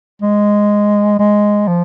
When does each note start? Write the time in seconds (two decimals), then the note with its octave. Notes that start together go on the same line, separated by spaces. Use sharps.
0.22 G#3
1.19 G#3
1.67 F3